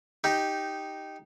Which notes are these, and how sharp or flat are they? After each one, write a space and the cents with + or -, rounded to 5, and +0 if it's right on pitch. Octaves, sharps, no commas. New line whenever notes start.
D#4 +0 G4 +0